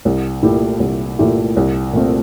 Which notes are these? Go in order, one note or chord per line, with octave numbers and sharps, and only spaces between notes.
C2
A#2 A3 E4 G4
C2
A#2 A3 E4 G4
C2
A#2 A3 C4